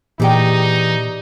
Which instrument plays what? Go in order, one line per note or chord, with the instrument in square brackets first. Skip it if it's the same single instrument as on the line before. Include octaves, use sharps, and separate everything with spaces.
[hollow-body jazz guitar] A#2 G#4 G5 [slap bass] E3 [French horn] D#4 [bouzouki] G4 D5